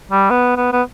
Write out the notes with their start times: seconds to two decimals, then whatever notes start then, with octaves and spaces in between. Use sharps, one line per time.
0.11 G3
0.30 B3
0.57 B3
0.73 B3